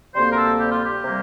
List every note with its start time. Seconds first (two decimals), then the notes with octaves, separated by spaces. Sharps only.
0.14 D2 C3 G3 A#3 C5
0.32 A#4
0.36 A4
0.59 G4
0.71 F4
0.84 G4
1.05 C3 G3 A#3